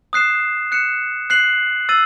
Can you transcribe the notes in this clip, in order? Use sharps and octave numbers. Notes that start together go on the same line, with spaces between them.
D#6 F#6 C7 E7
F#6 C#7 E7
F#6 C7 F#7
E6 A6 D#7 F#7